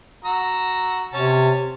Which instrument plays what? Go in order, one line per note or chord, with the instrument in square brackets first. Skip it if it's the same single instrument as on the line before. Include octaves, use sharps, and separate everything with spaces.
[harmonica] F#4 A#5 E6
[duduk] C3 [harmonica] C#4 C#5 A5